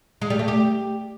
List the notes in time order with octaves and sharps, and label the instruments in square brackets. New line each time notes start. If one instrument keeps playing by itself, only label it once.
[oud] G#3
G3
A3
G4